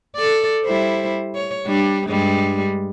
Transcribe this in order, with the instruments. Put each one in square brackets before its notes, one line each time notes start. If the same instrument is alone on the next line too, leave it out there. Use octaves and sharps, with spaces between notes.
[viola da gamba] A4 D5
G3 E4 C5
C#5
G3 D4
G2 G3 G#3